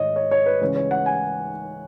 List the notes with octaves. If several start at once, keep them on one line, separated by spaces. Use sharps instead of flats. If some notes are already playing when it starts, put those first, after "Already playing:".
Already playing: G#2 D#3 C#5 D#5
C#5
C#5
B4
C#2 C#3 E3 C#5
C#5
F#5
G#5